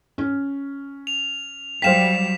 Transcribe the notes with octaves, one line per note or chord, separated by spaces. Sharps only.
C#4
F7
F#3 G3 C5 F5 G5 B6 E7